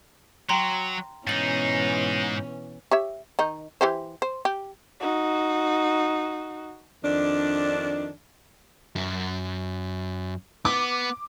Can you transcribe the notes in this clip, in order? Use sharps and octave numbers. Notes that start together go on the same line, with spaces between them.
F#3 G5 A#5 C6
G#2 B2 E3 C#4 D#4 A6 D#7 F#7
G4 C#5 E5
D#3 D#4
E3 G4 C5
C5
G4
D#4 F#4
F2 D#3 D4
F#2
B3 D6